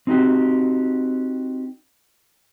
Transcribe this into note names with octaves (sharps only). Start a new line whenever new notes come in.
C4 D#4 F#4 G4